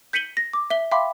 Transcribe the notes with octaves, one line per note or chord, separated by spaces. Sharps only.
G6 B6 C#7 D#7 F#7 G7
A#6
D6
E5 G7
E5 F5 G5 B5 C6 D6